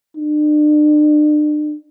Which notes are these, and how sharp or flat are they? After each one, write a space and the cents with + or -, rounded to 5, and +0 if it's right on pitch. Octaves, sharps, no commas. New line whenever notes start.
D4 +40